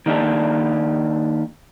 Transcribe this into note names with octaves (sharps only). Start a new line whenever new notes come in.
D#3 A#3 D4 G4 A4